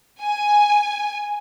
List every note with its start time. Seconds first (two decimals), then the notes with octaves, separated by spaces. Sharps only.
0.21 G#5